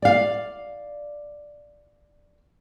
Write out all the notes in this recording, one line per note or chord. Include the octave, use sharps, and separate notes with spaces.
D5 F5